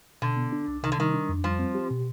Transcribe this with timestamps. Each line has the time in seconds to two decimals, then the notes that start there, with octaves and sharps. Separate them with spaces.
0.22 B2 D3
0.37 B3
0.53 D4
0.68 C2
0.83 C3 D#3
0.92 D3
0.98 D#3 G3
1.14 D4
1.29 F2
1.44 F3 G3
1.59 C4
1.75 G4
1.90 B2